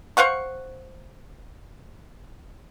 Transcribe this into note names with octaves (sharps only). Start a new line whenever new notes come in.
C5 F5 F#5 C#6